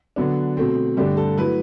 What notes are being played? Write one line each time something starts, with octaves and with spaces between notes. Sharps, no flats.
D3 F#3 B3 D4
B2 A3 C4
G2 D3 A3 D4 G4
A4
F#3 A3 E4 B4